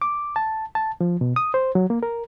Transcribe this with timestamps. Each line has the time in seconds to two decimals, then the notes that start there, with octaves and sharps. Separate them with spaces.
0.02 D6
0.36 A5
0.75 A5
1.01 F3
1.21 B2
1.36 D#6
1.54 C5
1.75 F#3
1.90 A#3
2.03 A#4